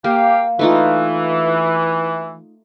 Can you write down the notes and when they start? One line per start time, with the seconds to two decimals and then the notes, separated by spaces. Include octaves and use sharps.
0.04 A#3 G4 F5 G5
0.59 E3 A3 D#4 F4